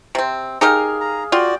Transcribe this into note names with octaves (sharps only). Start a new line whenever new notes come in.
C3 C4
D#4 G4 G#4 A#4 F5
A#5
F4 F#4 D5 G5